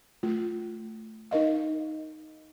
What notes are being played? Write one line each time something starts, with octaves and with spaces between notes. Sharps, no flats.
A3 F4
D#4 A#4 D#5 F5